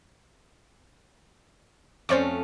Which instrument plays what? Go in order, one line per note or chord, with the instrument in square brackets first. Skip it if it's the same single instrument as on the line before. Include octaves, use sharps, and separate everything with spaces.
[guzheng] F2 A3 C#4 [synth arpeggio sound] C5 D5 C#6